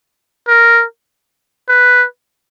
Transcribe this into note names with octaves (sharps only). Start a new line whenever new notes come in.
A#4
B4